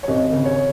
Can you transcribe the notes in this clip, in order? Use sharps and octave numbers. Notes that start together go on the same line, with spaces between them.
C#5
G#1 D#5
C#3
C#5